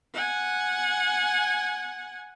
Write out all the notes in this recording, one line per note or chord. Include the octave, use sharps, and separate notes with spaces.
F#5 G#5